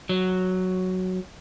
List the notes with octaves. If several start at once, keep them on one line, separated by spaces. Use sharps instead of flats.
F#3